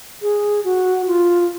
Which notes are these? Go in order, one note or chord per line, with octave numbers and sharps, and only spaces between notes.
G#4
F#4
F4